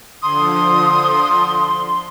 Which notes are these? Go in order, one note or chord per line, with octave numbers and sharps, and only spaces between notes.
D3 F3 C6 D#6